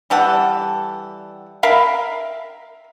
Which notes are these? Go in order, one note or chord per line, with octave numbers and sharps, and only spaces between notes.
E3 G3 A4 F#5
A#4 E5 F5 B5